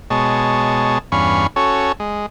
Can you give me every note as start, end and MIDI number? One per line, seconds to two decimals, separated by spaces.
0.10 0.98 47
0.10 0.98 56
0.10 0.98 73
0.10 0.98 81
1.12 1.47 40
1.12 1.47 43
1.12 1.47 61
1.12 1.47 77
1.12 1.47 83
1.12 1.47 85
1.56 1.92 61
1.56 1.92 66
1.56 1.92 69
1.56 1.92 73
2.00 2.26 56